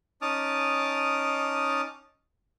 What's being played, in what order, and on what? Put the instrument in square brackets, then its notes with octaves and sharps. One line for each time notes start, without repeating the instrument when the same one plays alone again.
[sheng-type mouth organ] C#4 D#4 A5 D6 D#6 F6